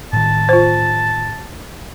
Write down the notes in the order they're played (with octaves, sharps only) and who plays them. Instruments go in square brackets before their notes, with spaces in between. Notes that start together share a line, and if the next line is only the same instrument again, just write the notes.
[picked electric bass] A2 D#3 [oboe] A5
[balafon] F4 C5